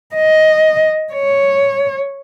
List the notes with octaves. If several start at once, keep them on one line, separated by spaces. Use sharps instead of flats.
D#5
C#5